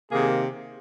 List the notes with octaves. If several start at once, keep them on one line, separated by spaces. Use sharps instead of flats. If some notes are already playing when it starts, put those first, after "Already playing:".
C3 D#3 A#3 G#4